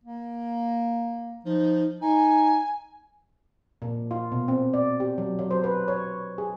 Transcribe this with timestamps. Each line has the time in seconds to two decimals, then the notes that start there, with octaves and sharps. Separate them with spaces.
0.04 A#3
1.45 F3 D#4
2.02 D#4 G#5
3.82 A#2
4.11 F4
4.32 B2
4.48 C4
4.74 D5
5.00 G4
5.18 F#3
5.39 F#3
5.51 C5
5.64 B4
5.88 C#5
6.38 G#4